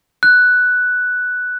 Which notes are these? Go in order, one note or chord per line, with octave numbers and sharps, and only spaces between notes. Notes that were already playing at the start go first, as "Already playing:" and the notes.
F#6